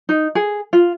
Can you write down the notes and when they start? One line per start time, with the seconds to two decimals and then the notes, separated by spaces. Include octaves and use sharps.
0.09 D#4
0.35 G#4
0.73 F4